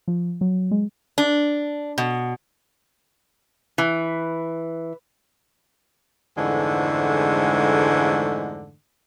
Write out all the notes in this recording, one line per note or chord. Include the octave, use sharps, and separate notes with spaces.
F3
F#3
G#3
D4
B2
E3
F2 G#2 D3 E3 G#3 A3